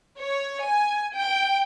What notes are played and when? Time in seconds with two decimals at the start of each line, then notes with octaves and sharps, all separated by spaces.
0.19 C#5
0.65 G#5
1.16 G5